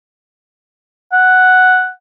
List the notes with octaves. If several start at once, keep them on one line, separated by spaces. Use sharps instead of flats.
F#5